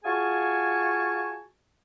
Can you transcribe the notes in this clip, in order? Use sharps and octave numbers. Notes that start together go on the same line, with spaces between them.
F4 F#4 G#4 G#5 A5 C#6